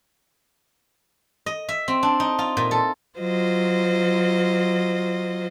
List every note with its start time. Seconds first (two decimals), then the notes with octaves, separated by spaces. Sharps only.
1.46 D#5
1.69 E5
1.88 C4
2.03 D4
2.20 D#4
2.39 F4
2.57 A#2
2.71 A4
3.18 F#3 F4 C5 D#5